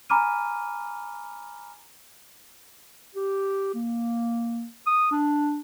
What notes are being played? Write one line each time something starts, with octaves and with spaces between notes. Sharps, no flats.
G#5 A#5 B5 D6 F6 D#7
G4
A#3
D#6
D4